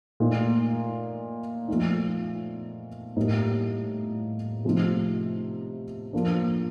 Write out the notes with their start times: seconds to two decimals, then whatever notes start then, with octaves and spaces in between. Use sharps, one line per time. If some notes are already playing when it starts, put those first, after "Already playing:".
0.20 A#2 A3 D#4
1.68 F3 A3 D#4
3.16 A2 G3 A#3 D#4
4.65 C3 F3 A3 D#4
6.13 F3 A#3 D4